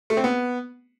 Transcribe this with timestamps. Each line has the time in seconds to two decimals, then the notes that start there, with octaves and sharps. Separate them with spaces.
0.10 A3
0.17 C4
0.24 B3